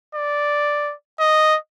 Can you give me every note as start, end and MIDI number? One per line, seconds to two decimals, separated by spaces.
0.15 0.94 74
1.20 1.57 75